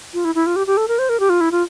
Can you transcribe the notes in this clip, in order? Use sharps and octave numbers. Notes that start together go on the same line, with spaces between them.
F4
E4
E4
F4
G4
G4
A4
A#4
C5
A#4
G4
F4
E4
F4